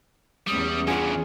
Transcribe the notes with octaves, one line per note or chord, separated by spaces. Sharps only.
E2 G3 C#4 D#6
G2 E3 F4 G#4 F#5